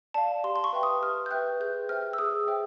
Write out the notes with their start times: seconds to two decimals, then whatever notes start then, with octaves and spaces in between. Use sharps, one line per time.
0.14 D5 F5 A5
0.44 G4 C6
0.56 C6
0.64 C#6
0.73 B4 E5 G5
0.83 D#6
1.02 G4 F6
1.26 G6
1.31 B4 E5 G5 F#6
1.60 G#4 G6
1.89 C5 E5 G5 F6
2.13 E6
2.18 G#4 D#6
2.48 C5 E5 G5